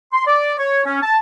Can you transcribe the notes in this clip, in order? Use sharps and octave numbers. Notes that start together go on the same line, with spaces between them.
C6
D5
C#5
C#4
A5